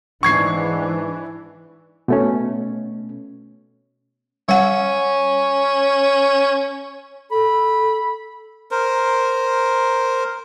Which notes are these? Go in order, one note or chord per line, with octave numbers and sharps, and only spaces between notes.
G#2 E3 D4 C#6 G#6 C7
B2 A3 C#4
G3 C#4 F#5
A4 B5
A#4 C5